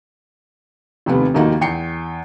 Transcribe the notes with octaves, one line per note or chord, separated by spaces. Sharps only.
F1 D#2 C3 B3
F1 D#2 D#3 A#3 D#4 F#4
E2 G5 C7 C#7